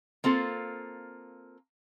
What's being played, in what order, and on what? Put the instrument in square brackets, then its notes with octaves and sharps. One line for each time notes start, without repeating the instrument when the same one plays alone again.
[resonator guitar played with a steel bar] A#3 C4 F4 A4